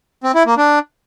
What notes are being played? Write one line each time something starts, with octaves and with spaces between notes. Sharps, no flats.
C4
E4
A#3
D4